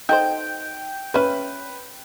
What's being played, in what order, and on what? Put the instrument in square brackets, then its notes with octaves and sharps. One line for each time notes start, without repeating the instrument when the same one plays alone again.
[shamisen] D#4 A4 C5 [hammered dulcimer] G5
[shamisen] C#4 E5 [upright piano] B4